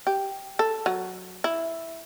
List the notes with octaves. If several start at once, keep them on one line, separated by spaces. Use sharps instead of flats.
G4
A4
F#3
E4